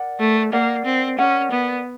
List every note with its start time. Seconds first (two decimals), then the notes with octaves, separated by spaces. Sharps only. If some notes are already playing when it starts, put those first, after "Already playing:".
Already playing: A#4 D5 F#5
0.19 A3
0.52 A#3 A#4 D5 F#5
0.85 C4
1.18 C#4 A#4 D5 F#5
1.51 B3